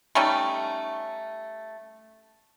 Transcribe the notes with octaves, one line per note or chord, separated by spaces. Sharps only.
G3 A3 C#4 D#4